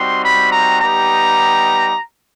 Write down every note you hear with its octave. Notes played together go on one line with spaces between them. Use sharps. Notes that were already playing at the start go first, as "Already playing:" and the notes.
Already playing: G3 C4 D#4 F#4 C6
B5
A#5
G3 B3 D#4 G4 A#5